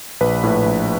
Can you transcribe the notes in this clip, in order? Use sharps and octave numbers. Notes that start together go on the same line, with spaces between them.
A#1 B4
A2
A#1